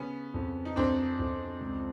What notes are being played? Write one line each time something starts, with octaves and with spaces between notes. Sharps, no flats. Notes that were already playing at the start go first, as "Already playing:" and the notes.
Already playing: C#3 B3 C#4
F2
D#4
F2 C4 D4
F2
C#2